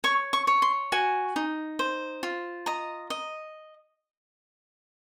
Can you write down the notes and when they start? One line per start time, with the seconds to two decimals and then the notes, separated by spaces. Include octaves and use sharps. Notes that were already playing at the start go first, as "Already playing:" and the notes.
0.04 C#5 C#6
0.33 C#6
0.47 C#5
0.62 C6
0.92 F#4 G#5
1.36 D#4
1.79 C5
2.23 F4
2.66 D#5 A#5
3.10 D#5